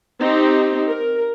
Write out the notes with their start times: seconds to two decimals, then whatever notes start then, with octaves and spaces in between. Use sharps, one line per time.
0.20 C4 D#4 G4
0.89 A#4